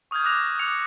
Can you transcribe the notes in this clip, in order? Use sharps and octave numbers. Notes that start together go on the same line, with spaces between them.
C#6 D#6 F6 G6 G#6
D6 D#6 F#6 G#6 A#6 F7
D#6 E6 F#6 G#6 C#7 F7